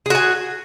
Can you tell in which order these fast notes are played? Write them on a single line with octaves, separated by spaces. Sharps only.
G#4 F#4 G#5